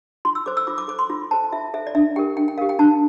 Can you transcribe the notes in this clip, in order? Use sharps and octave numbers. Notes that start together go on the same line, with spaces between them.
F4 C6
E6
A4 C5 D6
E6
F4 D6
D6
A4 C5 D6
C6
F4
A4 C5 A5
F4 E5
A4 C5 E5
D5
D4 E5
G4 A#4 G5
D4 G5
G5
G4 A#4 F5
G5
D4 A5